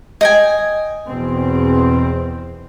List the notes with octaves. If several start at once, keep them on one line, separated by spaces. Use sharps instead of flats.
D#5 G5 G#5
E2 B2 C4